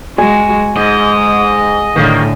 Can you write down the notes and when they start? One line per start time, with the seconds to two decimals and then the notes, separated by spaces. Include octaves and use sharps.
0.18 G#3 F#4 G#5
0.76 G#2 G#3 D#5
1.96 A2 D3 D#3 A#3